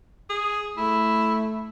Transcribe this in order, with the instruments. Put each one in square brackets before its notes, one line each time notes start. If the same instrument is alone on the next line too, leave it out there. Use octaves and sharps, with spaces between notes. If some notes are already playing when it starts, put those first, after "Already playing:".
[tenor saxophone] G#4
[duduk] A3 [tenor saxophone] E4